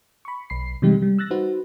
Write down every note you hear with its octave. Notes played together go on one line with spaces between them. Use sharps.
B5 C#6
B1 B5 C7
C3 E3 G3 G#3 D#4 G4
G3
E6 F#6 A6 A#6
D#4 F#4 B4 C5